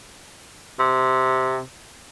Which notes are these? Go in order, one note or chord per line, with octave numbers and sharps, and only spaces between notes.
C3